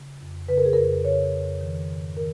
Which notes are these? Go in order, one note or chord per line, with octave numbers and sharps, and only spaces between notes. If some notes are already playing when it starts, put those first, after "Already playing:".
Already playing: C#3
F2
C#3 B4
A#4
G#4
F2 A#4
C#3 C#5
F2
D#3
G#2
D#3 A#4